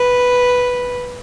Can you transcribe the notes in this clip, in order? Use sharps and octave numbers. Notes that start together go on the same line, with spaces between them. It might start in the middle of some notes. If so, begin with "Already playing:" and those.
Already playing: B4